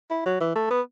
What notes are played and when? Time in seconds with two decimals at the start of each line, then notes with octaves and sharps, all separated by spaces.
0.11 E4
0.26 F#3
0.41 E3
0.56 A3
0.70 B3